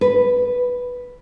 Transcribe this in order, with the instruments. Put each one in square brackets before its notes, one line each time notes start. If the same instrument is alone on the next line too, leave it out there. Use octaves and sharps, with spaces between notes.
[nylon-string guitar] B4